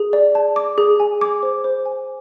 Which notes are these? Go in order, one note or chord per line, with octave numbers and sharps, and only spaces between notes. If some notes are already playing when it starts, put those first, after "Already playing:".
Already playing: G#4
D5
A5
D6
G#4
G#5
D6
C5
C5
G#5